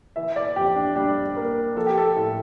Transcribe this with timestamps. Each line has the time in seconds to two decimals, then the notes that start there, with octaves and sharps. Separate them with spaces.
0.16 E3 E5
0.36 D5
0.56 F2 G4
0.76 D4
0.96 G3 D4
1.36 A#3
1.76 F3 A4
1.87 G4
1.98 A4
2.16 A2